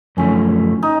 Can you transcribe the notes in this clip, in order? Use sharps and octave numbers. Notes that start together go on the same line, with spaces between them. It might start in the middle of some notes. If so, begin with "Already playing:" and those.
F#2 D3 F3 A3 C#4
D#4